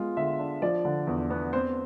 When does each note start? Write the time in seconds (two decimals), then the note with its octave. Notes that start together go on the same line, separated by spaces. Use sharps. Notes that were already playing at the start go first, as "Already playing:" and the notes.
Already playing: G#3 B3 F4
0.17 D3 E5
0.39 D4
0.62 F3 D5
0.85 D3
1.07 E2
1.30 B3
1.53 C4 C5